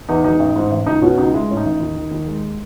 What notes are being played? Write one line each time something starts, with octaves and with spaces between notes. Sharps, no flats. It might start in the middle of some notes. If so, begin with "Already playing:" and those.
E2 D#4
E1 D#4
A1
G#2
A1
C#2 D#4
B2 C#4
C#2 D#4
G#3 E4
A2 C#4
D#4
A1
D#2
D#3
D#2
G#3